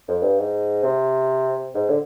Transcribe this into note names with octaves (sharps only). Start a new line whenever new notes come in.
F2
G2
G#2
C3
G#2
D3